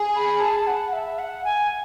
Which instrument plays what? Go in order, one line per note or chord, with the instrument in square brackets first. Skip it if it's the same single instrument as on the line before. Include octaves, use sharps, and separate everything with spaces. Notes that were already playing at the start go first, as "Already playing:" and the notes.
Already playing: [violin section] G#4
[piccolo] B5
A5
F#5
E5
F#5
G#5